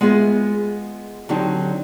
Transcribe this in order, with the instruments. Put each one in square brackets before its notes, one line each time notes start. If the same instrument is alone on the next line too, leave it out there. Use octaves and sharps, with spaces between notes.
[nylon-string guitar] G#3 B3 F4 G#4 D#5 E5
D3 F#3 C4 D#4 G4